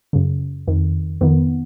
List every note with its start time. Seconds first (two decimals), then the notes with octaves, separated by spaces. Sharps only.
0.13 F#2 C#3
0.67 F2 D#3
1.21 F2 D#3 B3